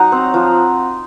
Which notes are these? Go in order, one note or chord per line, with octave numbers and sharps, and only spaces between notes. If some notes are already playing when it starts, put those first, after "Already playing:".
Already playing: F#3 D#4 F#5 G#5 A#5
C4
F3